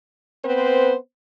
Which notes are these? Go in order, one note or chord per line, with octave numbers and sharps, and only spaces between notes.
B3 C4 B4 C5